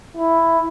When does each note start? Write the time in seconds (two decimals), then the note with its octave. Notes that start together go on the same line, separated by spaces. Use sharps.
0.17 E4